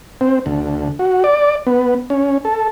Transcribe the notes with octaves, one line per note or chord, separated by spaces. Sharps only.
C4
D2
F#4
D5
B3
C#4
A4